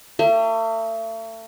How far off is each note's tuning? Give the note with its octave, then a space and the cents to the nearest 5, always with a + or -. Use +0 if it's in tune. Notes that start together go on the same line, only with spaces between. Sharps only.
A3 +40 E5 -45